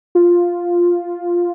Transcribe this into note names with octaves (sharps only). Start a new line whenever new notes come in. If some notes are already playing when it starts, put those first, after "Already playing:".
F4